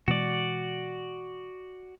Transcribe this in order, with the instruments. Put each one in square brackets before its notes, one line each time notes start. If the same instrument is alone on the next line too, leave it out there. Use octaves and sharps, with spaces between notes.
[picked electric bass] B2 E3 G#3 [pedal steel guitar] F#4 D5